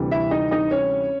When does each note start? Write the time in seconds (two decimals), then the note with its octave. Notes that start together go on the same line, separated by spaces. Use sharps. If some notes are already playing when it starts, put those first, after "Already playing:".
Already playing: D2 C3 E3 G3
0.11 E4 E5
0.31 D#4 D#5
0.51 D#4 D#5
0.71 C#4 C#5